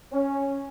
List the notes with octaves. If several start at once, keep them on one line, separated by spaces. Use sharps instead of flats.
C#4